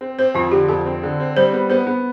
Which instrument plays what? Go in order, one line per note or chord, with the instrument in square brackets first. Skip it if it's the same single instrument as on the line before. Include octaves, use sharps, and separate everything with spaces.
[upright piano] C4
[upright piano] C4 [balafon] C5
[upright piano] F2 [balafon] F4
[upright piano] D3 [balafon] G4
[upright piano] F2 [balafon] A4
[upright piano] C4
D3
C4
[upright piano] G3 [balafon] C5
[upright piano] B3
[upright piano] B3 [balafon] C5
[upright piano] B3